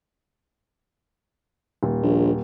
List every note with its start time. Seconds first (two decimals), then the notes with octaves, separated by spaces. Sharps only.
1.83 D#1
2.02 A#1